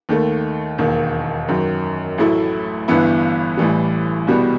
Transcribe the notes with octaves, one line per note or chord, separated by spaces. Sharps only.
D#2 D#3 A3
E1 D#2 D#3
F#2 D#3 F#3
A1 A2 F#3 A3 E4
G1 G2 E3 B3 E4
A1 A2 E3 G3
C2 B2 G3 B3